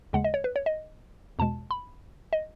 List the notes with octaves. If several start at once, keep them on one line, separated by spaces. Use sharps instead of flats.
D#2 C#3 G#3 F#5
D#5
C#5
B4
C#5
D#5
E2 B2 G#3 A5
B5
D#5